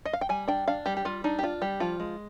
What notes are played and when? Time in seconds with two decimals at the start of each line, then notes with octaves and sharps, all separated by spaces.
0.05 D#5
0.13 F5
0.21 G5
0.29 G3 G#5
0.48 D4 G5
0.68 D4 F5
0.86 G3 G4
0.97 G4
1.05 G3 F4
1.24 D4 D#4
1.39 G4
1.43 D4 F4
1.61 G3 G4
1.80 F3 F4
2.00 G#3